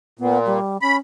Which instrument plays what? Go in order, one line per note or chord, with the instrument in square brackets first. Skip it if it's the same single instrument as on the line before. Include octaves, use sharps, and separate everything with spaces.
[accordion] A#2 [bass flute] B3
[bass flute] G3
[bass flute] C#4 [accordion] B5